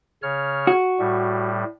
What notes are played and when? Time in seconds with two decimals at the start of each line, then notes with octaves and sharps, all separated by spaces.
0.23 C#3 C#5 F6
0.67 F#4
0.99 A2 G3